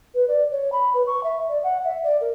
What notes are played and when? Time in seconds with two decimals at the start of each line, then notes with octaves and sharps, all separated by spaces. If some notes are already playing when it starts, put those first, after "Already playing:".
0.14 B4
0.28 D5
0.52 C#5
0.72 B5
0.94 B4
1.07 C#6
1.23 E5
1.49 D5
1.63 F#5
1.84 E5
2.04 D5
2.21 A#4